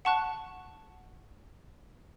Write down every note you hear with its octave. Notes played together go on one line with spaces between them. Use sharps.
F#5 A5 C#6 F#6